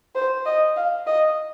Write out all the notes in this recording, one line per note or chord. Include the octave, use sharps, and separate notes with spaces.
C5
D#5
F5
D#5